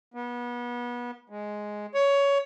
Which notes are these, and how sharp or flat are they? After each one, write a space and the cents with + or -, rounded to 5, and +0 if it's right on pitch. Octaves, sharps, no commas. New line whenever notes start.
B3 -30
G#3 +5
C#5 +15